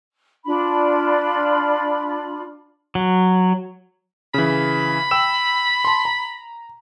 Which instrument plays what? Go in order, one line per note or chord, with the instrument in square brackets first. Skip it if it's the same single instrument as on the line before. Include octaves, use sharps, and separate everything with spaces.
[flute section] D4 F4 B5
[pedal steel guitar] F#3
[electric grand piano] C#3 E3 [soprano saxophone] B5
[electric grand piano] G5 E6 E7
A5 C6
A#5